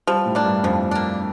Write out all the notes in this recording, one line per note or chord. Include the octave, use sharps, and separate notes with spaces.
F3 G3
A2
A#3 D4
G2
F2 F3
A#3 D4